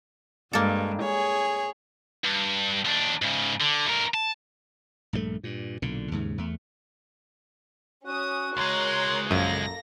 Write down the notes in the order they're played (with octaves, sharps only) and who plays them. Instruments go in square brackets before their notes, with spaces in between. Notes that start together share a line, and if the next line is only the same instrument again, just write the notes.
[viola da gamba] G2 [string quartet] G#3 [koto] A#3 A4
[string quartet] G#4 [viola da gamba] C#5
[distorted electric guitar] G2
D#2 D4
G#2 C#3
D3
D2 A#4
A5
[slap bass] A#1 G2 D3 A3
G2 A#2
B1 A#2 D3
D#2 G#2 C#3
E2 A3
[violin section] C#4 D#6 [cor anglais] F#4
[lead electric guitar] C#2 G#3 [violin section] A#4 C#5 C6
[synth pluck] A#1 F#2 [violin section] A#3 A4 A#6